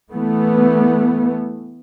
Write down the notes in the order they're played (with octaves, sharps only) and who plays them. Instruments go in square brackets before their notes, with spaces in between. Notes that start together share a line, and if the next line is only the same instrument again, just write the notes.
[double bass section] E3 A3 B3